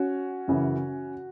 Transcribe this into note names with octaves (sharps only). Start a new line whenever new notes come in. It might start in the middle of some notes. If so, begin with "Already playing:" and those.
Already playing: C#4 F#4
F#2 C#3 E3